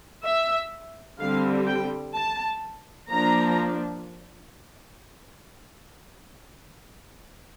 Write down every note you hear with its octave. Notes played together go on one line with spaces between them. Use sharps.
E5
D3 G3 C4 F5
G5
A5
F3 A#3 D4 A#5